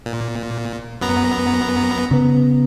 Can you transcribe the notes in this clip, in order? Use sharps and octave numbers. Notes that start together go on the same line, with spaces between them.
A#2
F#2 B3 A#5
C#3 B3